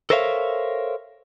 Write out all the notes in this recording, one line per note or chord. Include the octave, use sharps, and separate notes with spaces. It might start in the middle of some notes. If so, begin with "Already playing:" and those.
A4 A#4 C5 C#5 E5 F5